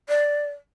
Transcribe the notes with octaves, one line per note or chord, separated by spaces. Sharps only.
D5